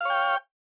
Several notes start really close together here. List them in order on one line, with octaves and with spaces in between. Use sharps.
F5 C#5 G5